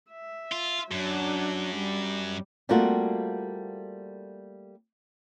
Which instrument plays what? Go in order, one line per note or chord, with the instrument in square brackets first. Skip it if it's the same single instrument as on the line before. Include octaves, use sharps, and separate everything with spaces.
[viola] E5
[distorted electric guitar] F4
[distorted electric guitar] F#2 [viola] F#3 D4
[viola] G3
[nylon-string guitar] G3 A3 A#3 C4 F4 F#4